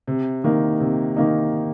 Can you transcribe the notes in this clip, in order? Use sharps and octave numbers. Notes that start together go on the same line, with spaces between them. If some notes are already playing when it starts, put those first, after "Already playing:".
C3
D#3 A#3 D#4
C3
D#3 A#3 D#4